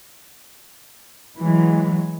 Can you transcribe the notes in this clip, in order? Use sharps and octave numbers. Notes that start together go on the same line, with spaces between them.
E3 F#3 G#3